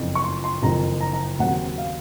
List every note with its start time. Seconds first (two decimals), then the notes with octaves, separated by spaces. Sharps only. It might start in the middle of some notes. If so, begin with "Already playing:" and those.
Already playing: F#1 F2 C#3 F3
0.15 C#6
0.24 C6
0.44 C6
0.63 F#1 F2 D#3 A#5
1.01 A#5
1.13 A#5
1.39 D#2 C#3 F#3 C4 F#5
1.78 F5